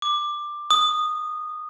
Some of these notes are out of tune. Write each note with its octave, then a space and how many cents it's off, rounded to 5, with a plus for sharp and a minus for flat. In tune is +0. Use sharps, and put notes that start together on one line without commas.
D6 +15
D#6 -15